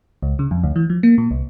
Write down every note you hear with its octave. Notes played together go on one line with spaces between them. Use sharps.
C#2
C#3
F2
D2
E3
F3
A#3
A#2
C2